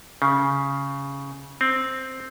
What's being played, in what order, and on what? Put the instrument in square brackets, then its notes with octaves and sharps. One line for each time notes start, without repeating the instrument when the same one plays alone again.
[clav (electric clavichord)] C#3
C4